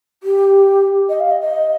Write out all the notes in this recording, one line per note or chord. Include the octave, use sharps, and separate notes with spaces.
G4
D#5
F5
D#5
D#5